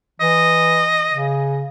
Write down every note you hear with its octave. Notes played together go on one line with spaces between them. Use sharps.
E3 D#5
C#3